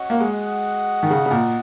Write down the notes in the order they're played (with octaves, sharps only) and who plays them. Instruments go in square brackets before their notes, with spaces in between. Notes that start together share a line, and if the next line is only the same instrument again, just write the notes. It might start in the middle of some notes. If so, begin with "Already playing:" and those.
Already playing: [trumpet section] C#4 F#4 D#5 F#5
[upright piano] A#3
G#3
[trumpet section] F#4 D#5 F#5
[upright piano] D#3
C#3
C#3
A#2